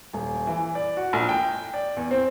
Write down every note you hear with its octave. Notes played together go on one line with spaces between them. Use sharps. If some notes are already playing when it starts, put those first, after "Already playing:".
D#1
E3
D5
F#4
A#1
G5
D5
E2
C4